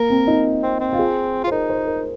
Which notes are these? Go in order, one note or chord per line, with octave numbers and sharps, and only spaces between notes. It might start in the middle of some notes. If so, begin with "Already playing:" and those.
Already playing: A#3 A#4
C4
D#4
C4
C4
F4
G#4
F4
C5
D#4 A#4
C5
A#4